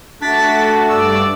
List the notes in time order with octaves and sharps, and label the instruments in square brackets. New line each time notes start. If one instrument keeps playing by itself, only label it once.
[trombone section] A3 [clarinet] D4 [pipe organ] F#4 [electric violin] A6 B6
[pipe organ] G2 D5 [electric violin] E6